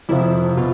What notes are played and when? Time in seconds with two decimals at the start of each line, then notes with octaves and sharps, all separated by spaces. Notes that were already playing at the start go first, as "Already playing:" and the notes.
0.09 F2 C3 F3 E4
0.57 B2 F4